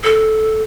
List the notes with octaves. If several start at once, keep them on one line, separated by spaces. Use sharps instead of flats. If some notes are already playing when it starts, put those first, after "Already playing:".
A4